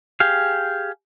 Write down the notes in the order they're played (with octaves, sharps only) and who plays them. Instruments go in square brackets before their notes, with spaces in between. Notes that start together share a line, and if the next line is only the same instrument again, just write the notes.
[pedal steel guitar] G4 G#4 F5